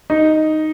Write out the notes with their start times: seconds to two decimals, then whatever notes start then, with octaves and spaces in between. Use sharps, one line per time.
0.10 D#4